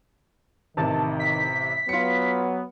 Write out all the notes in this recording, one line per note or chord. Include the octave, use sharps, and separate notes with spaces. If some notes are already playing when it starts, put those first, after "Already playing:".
A1 C3 D#3 A5
B6
F#3 B3 F4 C#7